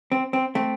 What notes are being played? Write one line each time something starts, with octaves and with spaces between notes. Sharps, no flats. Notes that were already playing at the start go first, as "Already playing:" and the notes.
C4
C4
A3 C4